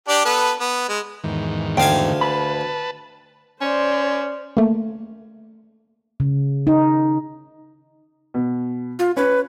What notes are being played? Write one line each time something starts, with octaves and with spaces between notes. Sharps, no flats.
D4 G4 D5
B3 A4 B4
B3
G#3
E2 G#2 D#3
D2 F5 G5 G#5
B4 A5 B5
C#4 C5 D5
A3 A#3
C#3
D#4
B2
F4
C#4 B4